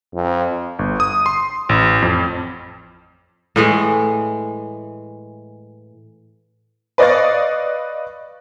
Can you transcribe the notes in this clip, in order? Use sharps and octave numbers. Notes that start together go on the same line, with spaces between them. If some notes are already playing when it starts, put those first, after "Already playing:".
F2
G1
D#6
C6
A1
F2
A2 E3 G#3
B4 D5 D#5 F5 C#6 A6